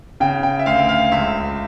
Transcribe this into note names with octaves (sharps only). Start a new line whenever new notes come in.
C#3 G5
G5
E5
D2 F5
F5
C#2 E5